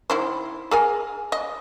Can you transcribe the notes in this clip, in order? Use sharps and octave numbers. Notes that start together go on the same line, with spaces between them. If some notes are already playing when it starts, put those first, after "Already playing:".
D#3 E4 C5
G#4 A#4 G#5
D#5